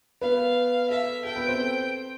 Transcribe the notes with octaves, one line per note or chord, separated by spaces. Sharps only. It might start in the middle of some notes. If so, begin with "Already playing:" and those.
B3 B4 F5
A4 E5
A4 G5
B3 B4
C4 C5